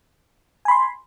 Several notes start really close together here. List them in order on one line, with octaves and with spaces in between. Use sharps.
G#5 B5 C6